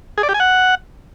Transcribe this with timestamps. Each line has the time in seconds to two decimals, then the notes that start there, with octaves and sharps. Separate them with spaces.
0.18 G#4
0.23 D5
0.29 G4
0.34 G#5
0.40 F#5